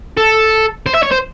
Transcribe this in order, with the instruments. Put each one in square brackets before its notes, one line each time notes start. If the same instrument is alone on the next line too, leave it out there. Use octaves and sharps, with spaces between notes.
[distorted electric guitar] A4
C5
E5
C#5
C5